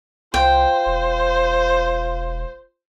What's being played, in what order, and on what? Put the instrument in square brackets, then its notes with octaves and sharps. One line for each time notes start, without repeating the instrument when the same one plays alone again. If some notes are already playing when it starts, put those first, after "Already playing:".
[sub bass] C2 [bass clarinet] F4 [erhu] C5 [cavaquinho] G5
[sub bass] E1